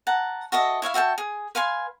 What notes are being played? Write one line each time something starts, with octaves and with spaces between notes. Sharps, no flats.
F#5 A5 A#5
F#4 A4 D#5 E5
E4 C#5 E5 F5
F#4 E5 G5 A5
G#4
B4 F5 G#5 C6